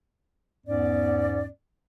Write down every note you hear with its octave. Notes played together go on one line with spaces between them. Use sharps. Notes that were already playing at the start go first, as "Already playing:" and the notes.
E2 G#2 B3 C#4 D5